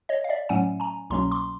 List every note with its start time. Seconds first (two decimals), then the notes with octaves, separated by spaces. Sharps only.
0.09 C#5 D#5
0.24 F5
0.29 D5 E5
0.49 A2 F#3 A3 C#4 F#5 G#5
0.80 G#5 A#5
1.10 C2 B2 F#3 A#3 C#4 A#5 C6
1.31 C6 D6